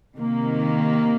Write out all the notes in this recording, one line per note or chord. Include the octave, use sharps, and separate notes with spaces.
C3 D#3 A#3